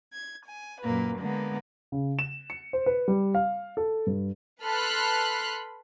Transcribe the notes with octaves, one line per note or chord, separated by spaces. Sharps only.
G#6
G#5
F#2 A#2 A#3 B4
D3 G#3 A#3 B3
C#3
E7
C#7
C5
B4
G3
F5
A4
G2
A4 B4 B5 C6 F6 F#6